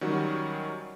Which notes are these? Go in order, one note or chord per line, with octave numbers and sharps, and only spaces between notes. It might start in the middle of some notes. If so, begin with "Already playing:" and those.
D#3 F#3 G3 C#4 F#4